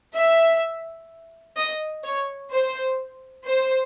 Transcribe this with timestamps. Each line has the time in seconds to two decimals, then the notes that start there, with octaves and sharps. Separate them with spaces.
0.15 E5
1.57 D#5
2.04 C#5
2.51 C5
3.45 C5